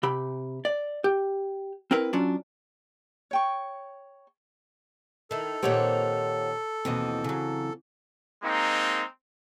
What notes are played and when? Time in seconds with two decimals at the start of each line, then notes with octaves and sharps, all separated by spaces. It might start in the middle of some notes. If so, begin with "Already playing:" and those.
0.03 C3 G4 B5
0.65 D5
1.04 G4
1.91 C4 E4 A#4 B4
2.13 F#3 C#4 D4 F4 F#4
3.31 C#5 G5 C#6
5.31 D#3 E4 A4
5.63 A#2 D#3 C4 G4 C#5 F#5
6.85 D#2 B2 E3 C4 D#5
7.24 C#3 F#3
8.42 G#3 A#3 C4 D#4